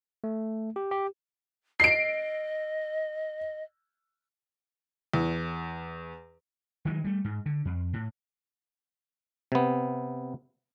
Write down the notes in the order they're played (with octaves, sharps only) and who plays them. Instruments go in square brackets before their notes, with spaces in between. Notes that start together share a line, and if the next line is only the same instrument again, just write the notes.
[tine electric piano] A3
G4
G4
[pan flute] D#5 [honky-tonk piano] C7 D7
[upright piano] E2
[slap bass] D#3 E3 F#3 G#3
G3 A3
G#2
D3
F2
A2
[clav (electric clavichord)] C3 B3